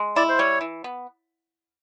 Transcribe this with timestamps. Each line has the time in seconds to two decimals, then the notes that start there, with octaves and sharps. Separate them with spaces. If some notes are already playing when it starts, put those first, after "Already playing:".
Already playing: G#3
0.16 E4 D5
0.29 C5
0.38 G3 C#5
0.61 E3
0.84 B3